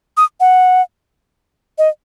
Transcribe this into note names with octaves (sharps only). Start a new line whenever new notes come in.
D#6
F#5
D#5